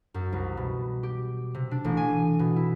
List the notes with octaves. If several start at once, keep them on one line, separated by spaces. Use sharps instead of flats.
F#2
C2
B2
G4
C3
D4
A1
G#5
D#7
B2
E4